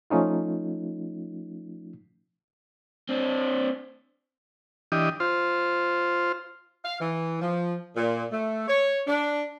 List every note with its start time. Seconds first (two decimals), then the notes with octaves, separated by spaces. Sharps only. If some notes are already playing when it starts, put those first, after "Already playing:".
0.10 F3 A3 C#4 D#4 F4
3.09 C4 D4
4.92 E3 D4 G4 D#5
5.20 F4 C5
6.84 F5
7.00 E3
7.41 F3
7.96 A#2
8.32 A3
8.68 C#5
9.07 D4